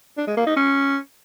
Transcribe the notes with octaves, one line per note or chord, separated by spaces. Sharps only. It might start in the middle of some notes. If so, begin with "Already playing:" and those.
D4
G#3
A#3
D#4
C#4